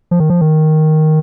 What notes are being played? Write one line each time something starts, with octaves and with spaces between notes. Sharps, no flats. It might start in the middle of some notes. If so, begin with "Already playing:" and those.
F3
D#3
F3
D#3